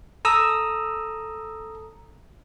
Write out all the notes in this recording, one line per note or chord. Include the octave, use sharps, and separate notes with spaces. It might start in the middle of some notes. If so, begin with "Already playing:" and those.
A4 A#5 D#6 E6